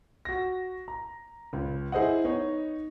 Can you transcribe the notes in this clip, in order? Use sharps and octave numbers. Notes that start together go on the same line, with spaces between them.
F#4 A#6
A#5
C#2
E4 G#4 C5 D#5 F#5
B3 D#4 C#5 D#5